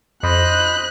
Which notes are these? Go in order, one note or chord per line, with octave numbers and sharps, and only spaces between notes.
F2 C5 D#5 B5 F#6